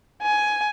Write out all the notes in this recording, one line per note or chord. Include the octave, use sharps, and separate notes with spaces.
G#5